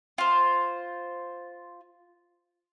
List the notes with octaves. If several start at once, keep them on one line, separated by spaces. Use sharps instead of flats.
F4 C5